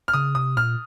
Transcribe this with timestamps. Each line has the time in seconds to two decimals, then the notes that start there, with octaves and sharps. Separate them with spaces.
0.08 F6
0.14 C#3 D#6
0.35 C3 D#6
0.56 A#2 F6